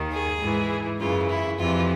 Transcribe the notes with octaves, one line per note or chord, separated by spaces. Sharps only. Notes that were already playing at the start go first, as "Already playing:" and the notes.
Already playing: D#2 D#3
G#4
G#2 E3
F#2 C#3 E3 F4
E4
F2 C3 E3 F4